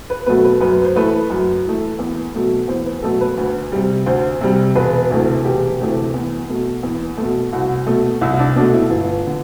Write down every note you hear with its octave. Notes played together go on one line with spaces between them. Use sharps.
B4
B2 F#3 A3 B4
B4
F#2 B4
C5
E3 A3 B4
F#2
E3 A3
E2
B2 F#3 A3
E2 C5
B4
B2 F#3 A3 A4
B4
D2
C3 G3
D2 C5
C3 G3
E1 B4
D2 C3 E3 A3
E1 G4
D2 C3 E3 A3
E2
B2 A3
E2
B2 A3
C2 F#4
B2 A3
C2 E4
E4
D4
B2 A3 D4
E4
G1
D3